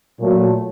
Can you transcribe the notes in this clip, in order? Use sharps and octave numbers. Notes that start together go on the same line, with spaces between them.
A#2 F#3 A3